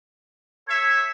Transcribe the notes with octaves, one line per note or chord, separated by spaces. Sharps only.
A4 C#5 E5 G#6